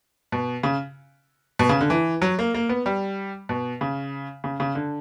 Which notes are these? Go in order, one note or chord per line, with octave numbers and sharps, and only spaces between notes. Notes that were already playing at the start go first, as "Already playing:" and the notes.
B2
C#3
B2
C#3
D3
E3
F#3
A#3
A#3
B3
G3
B2
C#3
C#3
C#3
D3